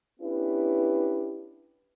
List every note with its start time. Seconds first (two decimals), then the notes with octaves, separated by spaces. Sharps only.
0.20 B3 C#4 D4 E4 G4 B4